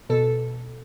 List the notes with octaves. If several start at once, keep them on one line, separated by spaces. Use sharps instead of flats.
B2 A4